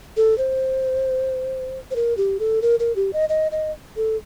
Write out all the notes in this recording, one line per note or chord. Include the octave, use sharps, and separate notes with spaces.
A4
C5
C5
A#4
G4
A4
A#4
A#4
G4
D#5
D#5
D#5
A4